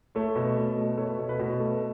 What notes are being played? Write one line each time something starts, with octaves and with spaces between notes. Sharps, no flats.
A3 C#5
B2
B2
A3
A3 C#5
B4
B2 C#5
B4
B2 F#4
A3